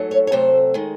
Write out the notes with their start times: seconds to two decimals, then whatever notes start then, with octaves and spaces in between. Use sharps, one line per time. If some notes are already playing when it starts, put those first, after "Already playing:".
Already playing: G#2 F#3 A3
0.11 C#5
0.27 C#5
0.32 C3 F#3 A3 C5
0.74 D#3 G#3